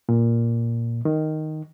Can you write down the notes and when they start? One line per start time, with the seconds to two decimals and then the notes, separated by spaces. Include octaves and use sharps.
0.09 A#2
1.05 D#3